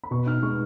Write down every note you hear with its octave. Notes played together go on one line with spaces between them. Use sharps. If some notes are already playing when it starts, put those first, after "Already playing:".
B5
B2 C#6
D#4 F6
G#3 C#6